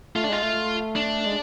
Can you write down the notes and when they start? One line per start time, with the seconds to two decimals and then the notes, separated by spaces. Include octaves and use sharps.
0.15 A3 F4
0.24 D4
0.29 G#3 F4
0.42 A3
0.96 D4
1.26 G#3